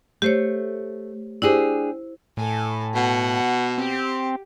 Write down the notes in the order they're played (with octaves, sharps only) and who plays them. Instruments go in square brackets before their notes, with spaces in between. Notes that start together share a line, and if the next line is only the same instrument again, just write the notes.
[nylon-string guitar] A3 [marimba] G4 C5 C#5
[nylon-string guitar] D4 G4 G#4 [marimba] E4 C5
[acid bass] A2 [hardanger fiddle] A4 G#5
[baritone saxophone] B2 [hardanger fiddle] F#5
[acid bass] C4 [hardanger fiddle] G4